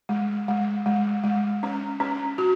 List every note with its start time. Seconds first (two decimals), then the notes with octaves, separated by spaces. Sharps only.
0.09 G#3
0.48 G#3
0.86 G#3
1.24 G#3
1.63 C#4
2.00 C#4
2.38 F#4